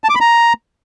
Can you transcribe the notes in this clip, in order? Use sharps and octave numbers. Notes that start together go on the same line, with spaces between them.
A5
D6
B5
A#5